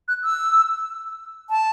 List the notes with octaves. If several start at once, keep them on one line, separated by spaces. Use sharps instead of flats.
F#6
E6
A5